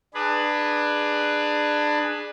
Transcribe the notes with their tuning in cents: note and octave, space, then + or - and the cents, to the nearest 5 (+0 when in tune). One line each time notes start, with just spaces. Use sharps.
D4 +20 G#4 +0 B4 +0